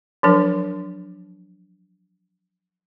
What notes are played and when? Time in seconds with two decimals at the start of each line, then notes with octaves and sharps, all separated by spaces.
0.23 F3 F#3 D4 A#4